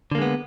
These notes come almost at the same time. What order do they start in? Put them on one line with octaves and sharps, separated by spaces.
D3 A#3 G#3 B3